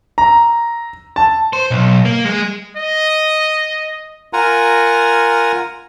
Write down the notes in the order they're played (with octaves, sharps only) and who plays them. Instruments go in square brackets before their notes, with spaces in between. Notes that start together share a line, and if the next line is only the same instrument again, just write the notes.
[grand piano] A#5
A5
[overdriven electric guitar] C5
B1
A#3
G#3
[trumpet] D#5
[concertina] F4 A#4 F#5 G#5 A#5